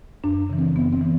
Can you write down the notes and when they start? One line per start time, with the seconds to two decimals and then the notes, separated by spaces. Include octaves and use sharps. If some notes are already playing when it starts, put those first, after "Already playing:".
0.24 F#2 D4
0.50 C#3 E3
0.58 C4
0.75 F#2 B3
0.93 C4
1.01 E3